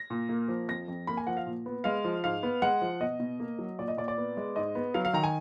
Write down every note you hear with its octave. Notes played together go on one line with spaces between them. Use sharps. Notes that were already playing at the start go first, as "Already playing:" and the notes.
Already playing: A#6
A#2
A#3
F3
F2 A#6
F2
A#3 B5
G#5
F3 F#5
F5
A#2
B3
G#3 F5
F3
G#2 F5
B3
G#3 F#5
F3
B2 D#5
B2
A#3
F#3
A#2 D5
D#5
A#2 D5
D5
B3
G#3
G#2 D#5
B3
F#3 F5
F5
D#3 A#5
G#5